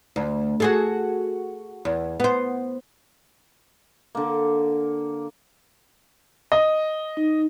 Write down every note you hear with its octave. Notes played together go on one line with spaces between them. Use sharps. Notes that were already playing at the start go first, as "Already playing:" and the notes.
D2
F#4 G#4 A4
E2
B3 C5
D3 A#3
D#5
D#4